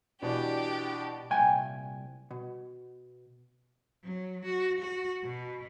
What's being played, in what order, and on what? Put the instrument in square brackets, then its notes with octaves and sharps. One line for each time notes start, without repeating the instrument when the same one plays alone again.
[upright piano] B2 E3 D5 [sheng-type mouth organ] D4 [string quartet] G4
[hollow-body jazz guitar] C2 A#2 G5 G#5
B2
[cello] F#3
F#4
F#4
B2